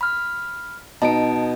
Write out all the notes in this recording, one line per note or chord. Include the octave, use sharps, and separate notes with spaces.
B5 F6
B2 D#4 A5 D7